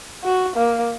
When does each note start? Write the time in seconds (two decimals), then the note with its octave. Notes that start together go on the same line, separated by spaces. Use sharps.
0.24 F#4
0.56 A#3